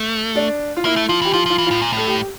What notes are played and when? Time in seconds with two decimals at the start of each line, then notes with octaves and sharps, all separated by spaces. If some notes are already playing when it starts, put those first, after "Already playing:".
Already playing: A3
0.35 D4
0.77 F4
0.85 A#3 E4
0.96 A3
1.08 F3 F4
1.22 E3 G4
1.33 F3 F4
1.46 F3
1.50 F4
1.58 E3
1.66 A2 F4
1.82 A#2
1.93 A2 A4
2.07 G4